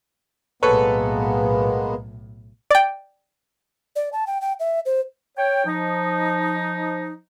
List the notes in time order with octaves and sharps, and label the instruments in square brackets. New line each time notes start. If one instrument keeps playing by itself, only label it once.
[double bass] B1 A2 [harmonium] G#3 A#3 B3 [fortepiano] A4 B4 C#5
[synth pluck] D5 G5
[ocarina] D5
A5
G5
G5
E5
C5
[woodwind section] C#5 G5
F3 D#4